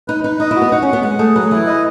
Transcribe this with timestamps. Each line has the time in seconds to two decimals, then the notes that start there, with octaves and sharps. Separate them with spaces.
0.08 D#4 B4
0.24 D#4 B4
0.40 D#4 D#5
0.51 E4
0.56 F#4
0.62 B3
0.72 D#4 F#5
0.82 C#4
0.87 F#5
0.93 B3
1.03 G#3 F#5
1.19 A3 G#4
1.35 F#3 B4
1.51 E3 E4
1.67 D#5